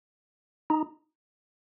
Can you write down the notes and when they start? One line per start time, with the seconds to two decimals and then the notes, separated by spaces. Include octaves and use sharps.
0.70 D#4